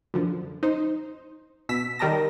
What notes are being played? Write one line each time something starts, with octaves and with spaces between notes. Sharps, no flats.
F#2 D3 F3
D#4 C5
B2 E6 B6
D#3 G3 A#4 D#5 A5 A#6